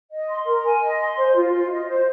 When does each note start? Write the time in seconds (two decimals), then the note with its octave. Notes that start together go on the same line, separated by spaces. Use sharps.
0.11 D#5
0.29 C6
0.46 A#4
0.64 G#5
0.82 D#5
0.99 C6
1.16 C5
1.34 F4
1.52 F4
1.70 D#5
1.88 C5